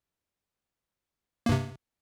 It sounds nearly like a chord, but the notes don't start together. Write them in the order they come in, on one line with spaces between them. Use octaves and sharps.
A#3 G2 C3